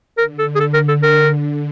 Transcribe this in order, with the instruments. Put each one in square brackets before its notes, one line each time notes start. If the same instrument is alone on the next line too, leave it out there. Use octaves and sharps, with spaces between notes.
[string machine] D3 [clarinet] A#4
[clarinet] A4
G#4
A4
A#4
A4
A#4